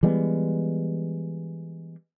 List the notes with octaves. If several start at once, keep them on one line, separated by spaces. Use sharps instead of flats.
E3 G3 G#3 B3